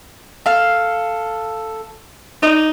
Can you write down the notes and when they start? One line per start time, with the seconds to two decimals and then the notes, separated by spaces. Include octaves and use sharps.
0.46 A4 F5
2.43 D#4 D5 D#5